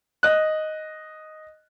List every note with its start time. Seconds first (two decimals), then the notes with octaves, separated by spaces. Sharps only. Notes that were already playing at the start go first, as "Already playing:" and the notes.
0.23 D#5 F#6